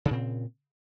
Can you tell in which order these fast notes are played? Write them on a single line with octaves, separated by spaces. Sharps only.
C#3 D4 A#2 C4